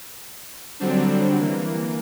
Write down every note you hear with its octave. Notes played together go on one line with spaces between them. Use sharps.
D3 F#3 G3 C4 D4
E3 A#3